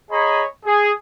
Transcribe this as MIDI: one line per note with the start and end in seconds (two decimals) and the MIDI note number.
0.11 0.45 68
0.11 0.45 73
0.11 0.45 75
0.11 0.45 82
0.11 0.45 83
0.66 0.92 68